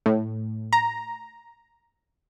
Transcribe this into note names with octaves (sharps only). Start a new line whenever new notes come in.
A2
A#5